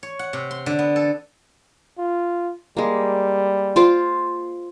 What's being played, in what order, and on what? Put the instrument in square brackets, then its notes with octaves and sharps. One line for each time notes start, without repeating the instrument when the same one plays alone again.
[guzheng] C#5
F#5
C3
C6
D3
B3
A4
[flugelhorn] F4
[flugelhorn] G3 [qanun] G#3 A#3
[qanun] F4 C5 D6